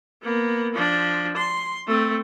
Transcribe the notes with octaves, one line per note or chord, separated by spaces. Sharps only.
A#3 B3
F3 D4
C6
A3 C4